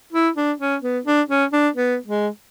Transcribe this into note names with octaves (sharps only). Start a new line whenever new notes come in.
E4
D4
C#4
B3
D4
C#4
D4
B3
G#3